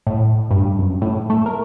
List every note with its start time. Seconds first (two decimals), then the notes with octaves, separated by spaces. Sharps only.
0.07 A2
0.51 G2
0.79 F#2
1.02 A2
1.30 A3
1.46 A#4